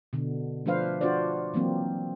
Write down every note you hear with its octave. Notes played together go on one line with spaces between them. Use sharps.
B2 D3
F3 A3 D4 B4 C5 F5
D4 F4 F#4 C5 D5
E3 F#3 A#3 C4